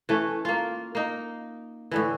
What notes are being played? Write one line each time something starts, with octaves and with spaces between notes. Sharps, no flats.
E3 A3 C#4
A#3 F4
A#3 D#4
A2 D3 E3